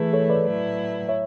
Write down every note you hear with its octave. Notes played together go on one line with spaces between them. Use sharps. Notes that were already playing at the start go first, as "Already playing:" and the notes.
Already playing: E3 A3 E4 G#4 B4
A4 C#5
B4 D5
A2 F#3 A3 E4
C#5 E5